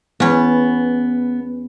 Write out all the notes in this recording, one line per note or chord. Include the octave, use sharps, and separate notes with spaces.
E2 B3 C#4